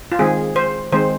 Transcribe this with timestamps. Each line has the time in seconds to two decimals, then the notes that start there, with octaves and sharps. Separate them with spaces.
0.12 F4
0.19 D#3 G#3 C4 G#4
0.56 C5
0.92 D#3 G#3 C4 C5